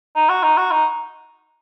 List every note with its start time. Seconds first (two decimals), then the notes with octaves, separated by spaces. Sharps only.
0.16 D#4
0.29 F#4
0.43 D#4
0.57 F#4
0.71 D#4